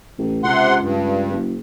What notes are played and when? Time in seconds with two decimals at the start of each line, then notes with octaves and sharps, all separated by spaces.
0.18 A1
0.44 C#2 C3 F#5 C6
0.82 G2
1.31 F#1